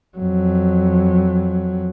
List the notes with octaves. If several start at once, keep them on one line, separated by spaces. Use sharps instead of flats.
F2 F#3